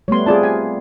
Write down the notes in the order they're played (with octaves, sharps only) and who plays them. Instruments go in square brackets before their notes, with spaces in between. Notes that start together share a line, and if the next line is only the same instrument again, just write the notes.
[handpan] G3 A3 B3 [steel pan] C#5 C6
[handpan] C4 F4 [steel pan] G#4 D5 A5
[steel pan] G#5